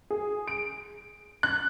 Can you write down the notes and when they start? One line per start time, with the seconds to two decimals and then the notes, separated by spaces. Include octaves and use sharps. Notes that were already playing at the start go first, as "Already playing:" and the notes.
0.10 G#4
0.48 D7
1.43 F#6